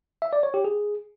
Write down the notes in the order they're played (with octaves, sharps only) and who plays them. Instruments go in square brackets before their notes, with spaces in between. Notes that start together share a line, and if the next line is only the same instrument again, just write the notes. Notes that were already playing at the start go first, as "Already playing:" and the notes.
[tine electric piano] E5
D5
C#5
G4
G#4